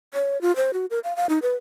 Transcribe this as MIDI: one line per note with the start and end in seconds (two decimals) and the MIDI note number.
0.14 0.40 73
0.41 0.55 65
0.56 0.71 72
0.73 0.86 66
0.91 0.99 70
1.04 1.16 77
1.16 1.26 77
1.29 1.39 63
1.42 1.56 71